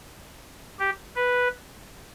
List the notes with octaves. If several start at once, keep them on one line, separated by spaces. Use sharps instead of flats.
G4
B4